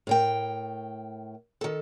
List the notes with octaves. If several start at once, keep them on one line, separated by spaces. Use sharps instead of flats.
A2 A#4 G5
D#3 A4